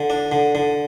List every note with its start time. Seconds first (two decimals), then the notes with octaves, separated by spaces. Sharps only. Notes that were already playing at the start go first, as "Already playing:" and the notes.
Already playing: D3
0.10 D4
0.32 D3
0.55 D3